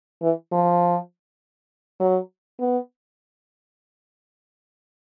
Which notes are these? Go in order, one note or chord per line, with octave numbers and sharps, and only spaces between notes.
E3
F3
F#3
B3